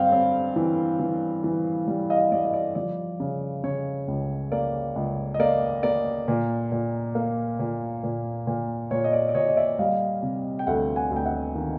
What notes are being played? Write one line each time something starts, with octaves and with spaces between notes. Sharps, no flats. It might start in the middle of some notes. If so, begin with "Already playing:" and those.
Already playing: G2 C4 F5 G5
C4
E3
E3
E3
G3
D#5 F5
G3 D5
D#5
D5
F3 D5
C#3
C#3 C#5
C#2
A#3 D5
C#2
D#5
A#3 D5
A#3 D5
A#2
A#2
A#3
A#2
A#2
A#2
A#2 C#5
D#5
D5
D5
A#2 C#5 D#5
D#5
D5 E5
G3 D#5 F5
C3
G5
D2 E5 F#5
F#5 G#5
D2
G5
E5 F#5
D#3